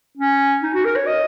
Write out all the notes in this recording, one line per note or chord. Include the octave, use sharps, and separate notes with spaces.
C#4
D#4
F#4
A#4
C#5
D#5